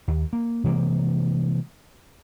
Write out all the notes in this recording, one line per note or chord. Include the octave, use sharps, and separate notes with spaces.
D#2
A#3
C3 E3 G#3 A#3